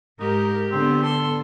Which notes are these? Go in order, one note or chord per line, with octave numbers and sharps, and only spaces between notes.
G#2 D#4 G4 A#4
D3 B3 C4
A4 C6